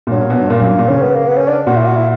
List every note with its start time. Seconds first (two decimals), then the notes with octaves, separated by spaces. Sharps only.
0.07 A#2
0.11 G2 F#3
0.21 A#2
0.30 B2
0.40 G2
0.50 A#2 A#3
0.60 F#2
0.70 G2
0.79 A#2
0.89 C#3 C#4
1.02 B3
1.15 A#3
1.28 B3
1.37 C#4
1.48 D4
1.67 A#2 F#4
1.77 E4
1.86 F#4
1.96 E4